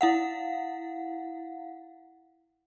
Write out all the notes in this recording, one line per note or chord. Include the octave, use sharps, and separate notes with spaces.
E4 F5 F#5